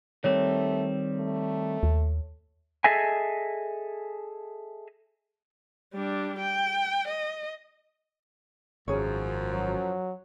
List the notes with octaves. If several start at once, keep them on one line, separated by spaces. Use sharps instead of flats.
D#3 G3 A3 C4 C#5
A3
D#2
G#4 A4 D#5 E5 G#5
G3 D4
G5
D#5
G#1 F#2 F3 C#4 G#4 C#5
F#3